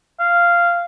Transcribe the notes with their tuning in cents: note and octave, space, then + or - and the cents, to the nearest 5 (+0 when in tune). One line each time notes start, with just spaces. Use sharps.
F5 -10